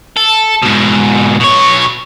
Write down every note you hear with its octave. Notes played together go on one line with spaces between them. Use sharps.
A4
G#2 B2
B2 C#5